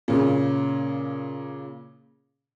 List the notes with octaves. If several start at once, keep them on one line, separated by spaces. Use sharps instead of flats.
A#2 C#3